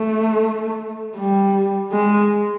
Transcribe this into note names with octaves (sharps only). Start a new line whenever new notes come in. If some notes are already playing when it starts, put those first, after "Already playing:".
Already playing: A3
G3
G#3